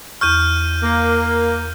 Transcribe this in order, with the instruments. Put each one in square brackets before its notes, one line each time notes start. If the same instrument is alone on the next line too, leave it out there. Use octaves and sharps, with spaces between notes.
[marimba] E2 C#6 [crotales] F6 G6 D#7
[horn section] A#3